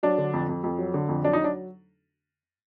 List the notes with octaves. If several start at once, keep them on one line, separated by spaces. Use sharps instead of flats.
F#3 D4
D3
F2
F2
F2
F#3
D3
F2
F#3 D4
D#4
F#3 D4